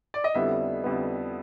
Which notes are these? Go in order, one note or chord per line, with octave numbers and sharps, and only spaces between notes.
D5
D#5
F2 D3 G3 B3 E4 E5
F2 D3 G3 B3 E4